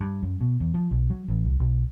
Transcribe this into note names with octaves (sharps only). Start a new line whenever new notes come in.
G2
F#2
B2
E2
F3
B1
F#3
A1
C2
B1